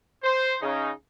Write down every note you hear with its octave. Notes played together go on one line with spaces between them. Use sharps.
C5
C#3 D#4